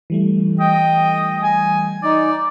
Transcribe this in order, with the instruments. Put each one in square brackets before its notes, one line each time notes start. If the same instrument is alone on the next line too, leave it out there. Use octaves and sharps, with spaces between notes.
[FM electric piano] E3 G3 A3
[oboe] D#5 [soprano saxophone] G5
[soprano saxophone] G#5
[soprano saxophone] D#4 [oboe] D5